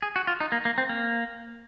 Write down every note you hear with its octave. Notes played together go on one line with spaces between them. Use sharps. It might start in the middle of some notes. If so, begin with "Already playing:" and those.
G#4
F#4
F4
D#4
A#3
A#3
C4
A#3